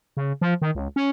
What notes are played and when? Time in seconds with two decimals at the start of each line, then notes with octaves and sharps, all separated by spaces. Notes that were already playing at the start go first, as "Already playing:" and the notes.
0.17 C#3
0.41 F3
0.62 D#3
0.75 C#2
0.96 C#4